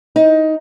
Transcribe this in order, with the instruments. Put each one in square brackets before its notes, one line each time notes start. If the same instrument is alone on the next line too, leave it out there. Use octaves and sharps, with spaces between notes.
[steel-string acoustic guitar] D#4